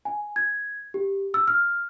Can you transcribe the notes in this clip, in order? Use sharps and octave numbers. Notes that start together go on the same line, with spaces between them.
G#5
G#6
G4
E6
F6